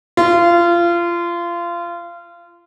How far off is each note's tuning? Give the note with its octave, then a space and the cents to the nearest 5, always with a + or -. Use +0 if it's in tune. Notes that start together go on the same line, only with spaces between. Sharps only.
F4 -25